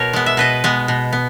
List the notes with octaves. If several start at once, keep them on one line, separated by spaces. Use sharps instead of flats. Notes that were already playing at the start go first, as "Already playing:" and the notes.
Already playing: B2 A#4 C#5
G#3 B3
E5
B2 B4 D#5
G#3 B3
B2
B3